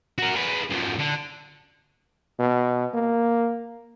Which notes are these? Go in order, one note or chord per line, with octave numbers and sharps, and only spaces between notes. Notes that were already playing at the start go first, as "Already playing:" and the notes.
F#4 A#4
G#4 B4
F#2 F3
D3
B2
A#3